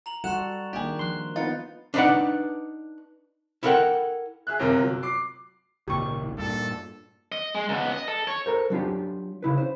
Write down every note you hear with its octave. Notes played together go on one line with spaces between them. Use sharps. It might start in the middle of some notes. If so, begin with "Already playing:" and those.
A#5 F7 F#7
G3 F#4 A4 F#5 C6 F#6 E7
D#3 A#3 D4 G4 G#4
F3 C6 F#6 G7
B3 D#4 F4 A6 C#7
D4 D#4 B4 D5 F#5
E4 A4 A#4 D5 F#5 G5
G#4 E5 F#6
G1 C3 A#4
F#3
D6 C7
G#1 C#2 A#2 G4 C#6
G2 A#2 A4
D#5
G#3
C#2 B3
D#5
A4
C#5
A4 A#4 C5
F#3 D4 F4 G4
C#3 E4 B4
C5